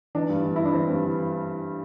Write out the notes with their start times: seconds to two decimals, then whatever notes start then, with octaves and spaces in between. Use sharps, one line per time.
0.15 E3 D4
0.29 G2
0.45 E3
0.56 G2 E4
0.66 D4
0.74 E3 C4
0.89 G2
1.04 E3